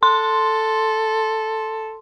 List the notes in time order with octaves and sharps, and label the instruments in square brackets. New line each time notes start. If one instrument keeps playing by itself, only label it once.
[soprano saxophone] A4 [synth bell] C6